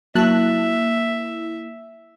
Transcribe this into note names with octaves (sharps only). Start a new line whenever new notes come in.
F#3 A#3 E4 E5 A5 F#6